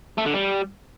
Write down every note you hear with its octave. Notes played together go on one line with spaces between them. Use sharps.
A3
D3
G3